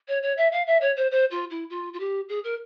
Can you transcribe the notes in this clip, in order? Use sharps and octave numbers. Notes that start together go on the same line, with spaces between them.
C#5
C#5
E5
F5
E5
C#5
C5
C5
F4
E4
F4
F4
G4
G#4
A#4